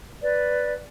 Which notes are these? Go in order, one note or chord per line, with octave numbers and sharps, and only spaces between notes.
B4 D5